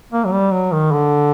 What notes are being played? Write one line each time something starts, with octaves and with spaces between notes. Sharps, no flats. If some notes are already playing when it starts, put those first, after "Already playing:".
A#3
F#3
G3
F#3
D#3
D3